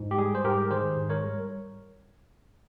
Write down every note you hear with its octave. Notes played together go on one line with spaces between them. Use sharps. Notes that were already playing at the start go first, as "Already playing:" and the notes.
Already playing: G#2
G4
G3 G#4
C5
G#2 G4 A#4
D#3 G#4 C5
G#2
A#4 C#5
G3